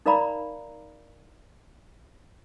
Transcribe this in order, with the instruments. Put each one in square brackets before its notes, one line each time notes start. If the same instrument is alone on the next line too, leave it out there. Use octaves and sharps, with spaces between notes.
[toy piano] D#4 A#4 D5 F5 A#5 B5